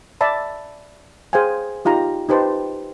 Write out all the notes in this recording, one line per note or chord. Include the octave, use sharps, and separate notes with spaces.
D5 E5 A5 B5
G#4 C5 F5 G5 G#5
D#4 F4 G4 A#5
D#4 G4 B4 C5 A5